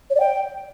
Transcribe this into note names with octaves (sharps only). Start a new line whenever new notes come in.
C#5
D5
G5